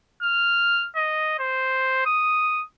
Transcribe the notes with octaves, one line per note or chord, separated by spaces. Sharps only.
F6
D#5
C5
D#6